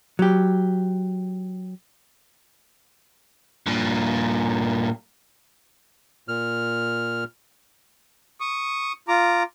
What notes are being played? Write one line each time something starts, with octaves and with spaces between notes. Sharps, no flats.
F#3 G4
G2 A#2
A#2 F6
C#6 D#6
F4 A#5 D6